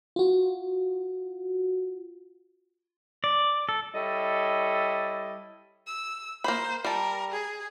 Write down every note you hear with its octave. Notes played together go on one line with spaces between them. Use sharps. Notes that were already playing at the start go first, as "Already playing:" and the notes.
F4 F#4
D5
A4
G3 E4 A4 C#5 D#5
E6
A#3 C5 B5
G3 A#4 A5
G#4